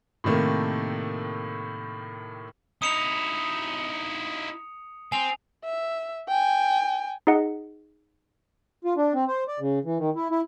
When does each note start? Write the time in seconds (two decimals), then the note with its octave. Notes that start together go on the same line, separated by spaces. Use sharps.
0.24 A2 C3 D#3 A3 A#3
2.82 D#4 E4 D#6 C#7 F7
5.12 C4 G#5 F7
5.65 E5
6.28 G5 G#5
7.27 D#4 G#4 D#5 F#5
8.85 F4
8.97 D4
9.14 C4
9.28 C5
9.48 D5
9.60 C#3
9.85 E3
9.99 D#3
10.16 E4
10.31 E4